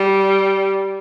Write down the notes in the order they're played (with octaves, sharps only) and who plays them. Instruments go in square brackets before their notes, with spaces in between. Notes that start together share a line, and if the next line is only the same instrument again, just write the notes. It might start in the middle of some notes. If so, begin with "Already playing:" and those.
Already playing: [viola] G3